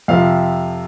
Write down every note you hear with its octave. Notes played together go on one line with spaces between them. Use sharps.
F2 C3 F3 F5